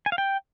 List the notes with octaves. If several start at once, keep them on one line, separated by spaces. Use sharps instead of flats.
G#5
F5
G5